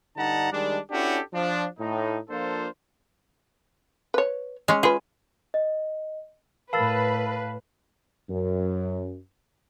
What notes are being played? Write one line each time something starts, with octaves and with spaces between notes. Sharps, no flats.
G2 D3 D#4 F#5 A5 A#5
D#3 G3 G#3 D4
C#4 D4 E4 F#4 G4 A4
F3 D4
A2 D#4
F3 A#3 D4 F4 A4 C5
B4 C#5
G#3 C#4
F4 G#4 B4
D#5
A2 A#4 B4 F5 A5 B5 E6 A6
F#2